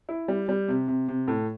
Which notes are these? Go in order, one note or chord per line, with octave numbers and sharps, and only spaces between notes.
E4
G3
G3
C3
C3
C3
A2